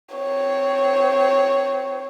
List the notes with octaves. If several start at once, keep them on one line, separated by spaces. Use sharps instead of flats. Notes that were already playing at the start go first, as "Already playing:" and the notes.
C4 C#5